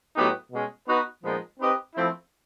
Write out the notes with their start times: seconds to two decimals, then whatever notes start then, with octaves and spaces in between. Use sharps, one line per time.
0.15 A2 F#3 B3 D#4 G4
0.50 B2 G#3 C#4
0.86 B3 D#4 F#4 B4
1.22 A#2 F3 G#3 B3 D#4
1.59 C4 D#4 G4 B4 D#5
1.95 F3 A3 C4 E4